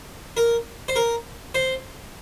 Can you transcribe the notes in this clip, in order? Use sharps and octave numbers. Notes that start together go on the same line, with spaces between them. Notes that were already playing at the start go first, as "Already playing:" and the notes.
A#4
C5
A#4
C5